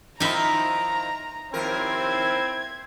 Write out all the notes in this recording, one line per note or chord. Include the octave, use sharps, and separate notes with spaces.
D#3 F3 D#4 E4 E5 A#5 B5
D#2 F3 C4 E4 A#4 C5 G#6